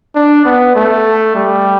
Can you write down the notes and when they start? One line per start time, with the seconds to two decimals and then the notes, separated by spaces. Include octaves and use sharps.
0.15 D4
0.45 B3
0.75 A3
1.36 G3